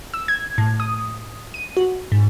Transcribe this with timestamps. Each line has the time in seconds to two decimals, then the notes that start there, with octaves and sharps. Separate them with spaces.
0.14 E6
0.28 G#6
0.58 A2
0.80 D#6
1.54 D#7
1.77 F#4
2.12 G#2